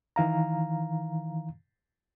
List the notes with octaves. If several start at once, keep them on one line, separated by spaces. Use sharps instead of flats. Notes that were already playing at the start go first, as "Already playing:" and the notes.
D#3 E3 F5 A#5